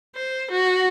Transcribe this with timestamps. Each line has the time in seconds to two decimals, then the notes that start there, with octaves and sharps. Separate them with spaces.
0.15 C5
0.51 F#4